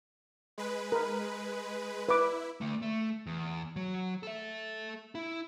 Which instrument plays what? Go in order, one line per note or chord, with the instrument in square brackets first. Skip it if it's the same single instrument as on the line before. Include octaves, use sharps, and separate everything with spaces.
[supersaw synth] G#3 B4
[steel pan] A#4 B5
[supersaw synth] E4 [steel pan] B4 D6
[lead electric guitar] D3 A3
A3
E2
F#3
A4 E5
E4